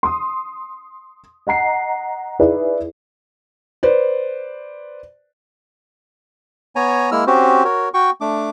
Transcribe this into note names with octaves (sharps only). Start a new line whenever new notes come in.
C6 D#6
D#5 F#5 A#5 C7
D#4 E4 G#4 B4 D5
B4 C5 D5
B3 C#5 G#5 A#5
G#3 A#3 E4 E6 F6
C4 C#4 F#4 G4 C5
F#4 A#4 C#5
F#4 G5 C#6
A3 D4 D6